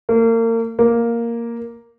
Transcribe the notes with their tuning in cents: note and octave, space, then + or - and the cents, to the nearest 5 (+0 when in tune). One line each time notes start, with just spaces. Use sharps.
A#3 -35
A#3 +0